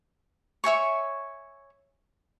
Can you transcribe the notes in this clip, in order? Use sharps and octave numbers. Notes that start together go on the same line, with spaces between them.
C#5 E5 G#5 C#6